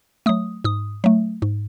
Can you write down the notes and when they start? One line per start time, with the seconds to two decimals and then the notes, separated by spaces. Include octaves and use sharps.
0.26 F#3 A3 D#6
0.64 G#2 D#6
1.04 F#3 A3
1.42 G#2